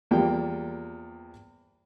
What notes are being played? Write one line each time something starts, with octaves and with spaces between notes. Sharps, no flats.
E2 F3 G3 A#3 G5